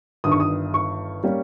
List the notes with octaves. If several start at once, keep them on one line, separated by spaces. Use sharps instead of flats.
G1 G2 D#3 D#6
C#6
D#6
C#6
G3 A#3 C#4